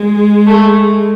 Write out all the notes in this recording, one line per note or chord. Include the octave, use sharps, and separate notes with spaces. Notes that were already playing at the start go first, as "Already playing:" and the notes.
Already playing: G#3
A3